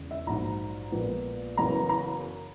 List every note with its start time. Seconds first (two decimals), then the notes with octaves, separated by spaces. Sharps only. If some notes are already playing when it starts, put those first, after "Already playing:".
Already playing: E1 E2 C#3
0.11 E5
0.26 A#1 G#2 F#3 A#5
0.92 A#1 A#2 G#3 B3
1.57 F#1 F#2 E3 B3 A#5
1.89 A#5